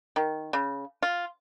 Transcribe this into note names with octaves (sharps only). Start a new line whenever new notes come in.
D#3
C#3
F4